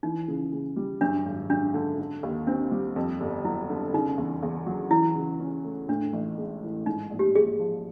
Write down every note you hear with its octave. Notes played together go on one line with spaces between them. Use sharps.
E3 D#4
C#3
C#3
G3
F#2 D4
G#1
F#3 D4
D3
D3
D#2
C4 D4
G3
F2
G1
F#3 E4
D3
C#3 D#4
E2
E2
F#3
E3 E4
C#3
C#4
A3
A2 D4
A1
G#3
E3
G#2 D#4
A#1
G4
A#1 G#4
F3